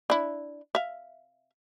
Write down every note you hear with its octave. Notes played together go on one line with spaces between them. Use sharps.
D4 E4
E5 F5